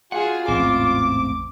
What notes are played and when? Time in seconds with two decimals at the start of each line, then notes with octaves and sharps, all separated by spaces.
0.12 F4 F#4 G#4 F#5
0.48 A1 E2 G#2 C4 D6